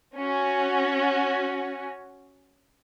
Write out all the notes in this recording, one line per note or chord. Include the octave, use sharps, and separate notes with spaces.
C#4 F#4